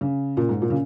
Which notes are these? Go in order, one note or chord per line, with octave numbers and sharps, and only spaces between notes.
C#3
A#2
G#2
A#2
C#3